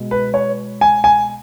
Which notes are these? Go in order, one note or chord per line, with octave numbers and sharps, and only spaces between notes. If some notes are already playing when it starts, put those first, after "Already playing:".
Already playing: B2 G#3
B4
C#5
G#5
G#5